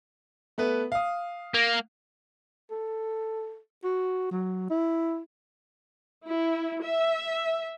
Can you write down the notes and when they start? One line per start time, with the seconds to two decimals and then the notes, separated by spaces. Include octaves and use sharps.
0.58 A3 B3 B4
0.92 F5 D#6
1.54 A#3
2.71 A4
3.84 F#4
4.31 F#3
4.70 E4
6.27 E4
6.83 E5